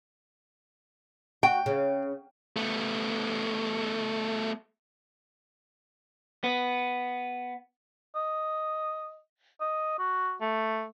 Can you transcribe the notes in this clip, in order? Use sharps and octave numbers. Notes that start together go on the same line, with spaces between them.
F#4 G5
C#3
A3 B3
B3
D#5
D#5
F#4
A3